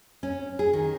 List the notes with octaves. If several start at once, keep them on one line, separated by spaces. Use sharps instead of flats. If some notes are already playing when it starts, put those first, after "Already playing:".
C#4
G#4
D#3